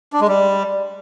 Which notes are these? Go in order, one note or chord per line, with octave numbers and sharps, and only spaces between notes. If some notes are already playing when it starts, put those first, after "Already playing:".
D4
G#3
G3